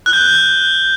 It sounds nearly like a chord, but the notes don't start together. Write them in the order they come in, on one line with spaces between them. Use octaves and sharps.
F#6 G7 G6